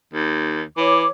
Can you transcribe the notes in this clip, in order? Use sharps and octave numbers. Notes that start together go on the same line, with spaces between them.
D#2
E3 C#5 D6